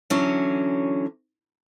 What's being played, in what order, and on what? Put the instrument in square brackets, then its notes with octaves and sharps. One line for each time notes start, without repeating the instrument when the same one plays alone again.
[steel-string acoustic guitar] D3 E3 F#3 C#4